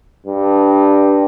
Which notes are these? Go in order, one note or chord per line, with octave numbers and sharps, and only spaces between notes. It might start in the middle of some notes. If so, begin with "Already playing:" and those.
G2